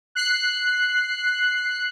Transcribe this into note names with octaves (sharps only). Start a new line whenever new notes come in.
F#6 C7